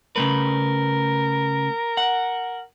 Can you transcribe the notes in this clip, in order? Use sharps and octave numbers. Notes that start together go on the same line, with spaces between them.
C#3 A3 A#4 B4
F#5